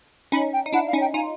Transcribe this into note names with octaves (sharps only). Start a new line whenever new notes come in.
C#4 D#4 B5
G5
D#4
D4 E4 F#5
F5
C#4 D#4
G5
D#4 F4 G#5